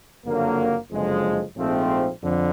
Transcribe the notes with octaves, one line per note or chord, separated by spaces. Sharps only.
F#1 F2 D3 F#3 A#3
F#1 F2 D3 F3 G#3
A#1 G#2 F3 A3 C4
F2 D3